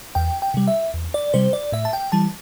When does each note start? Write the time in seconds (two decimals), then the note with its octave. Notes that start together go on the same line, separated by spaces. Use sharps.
0.15 E2 G5
0.42 G5
0.54 C3 G3
0.68 E5
0.94 E2
1.14 D5
1.34 C3 G3 C5
1.53 D5
1.72 A2 E5
1.85 A5
1.93 G5
2.12 E3 G3 A5